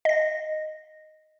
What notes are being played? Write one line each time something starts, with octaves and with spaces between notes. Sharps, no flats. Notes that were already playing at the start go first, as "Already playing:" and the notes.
D#5 A#6